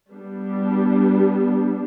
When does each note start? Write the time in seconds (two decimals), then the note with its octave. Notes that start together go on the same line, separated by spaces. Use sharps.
0.12 G3 B3 D4